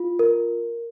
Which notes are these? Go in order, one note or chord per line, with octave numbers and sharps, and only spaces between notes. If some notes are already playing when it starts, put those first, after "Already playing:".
Already playing: F4
A#4